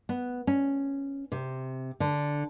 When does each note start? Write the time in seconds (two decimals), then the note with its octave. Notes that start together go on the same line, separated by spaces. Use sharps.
0.09 B3
0.47 C#4
1.32 C3
2.00 D3